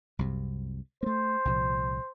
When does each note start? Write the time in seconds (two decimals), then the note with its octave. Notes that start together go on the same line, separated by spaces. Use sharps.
0.19 C2 F#2 C3
1.03 A3 A#3 C5
1.45 C2 A#2 F3